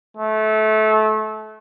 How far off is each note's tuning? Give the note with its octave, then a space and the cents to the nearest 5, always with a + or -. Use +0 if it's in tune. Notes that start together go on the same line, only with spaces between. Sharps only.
A3 -25